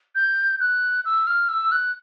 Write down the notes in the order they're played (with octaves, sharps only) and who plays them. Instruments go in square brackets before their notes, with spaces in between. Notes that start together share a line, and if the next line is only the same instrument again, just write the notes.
[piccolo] G6
F#6
E6
F6
E6
F#6